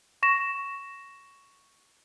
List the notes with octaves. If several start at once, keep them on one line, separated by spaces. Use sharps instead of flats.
C#6 A#6 E7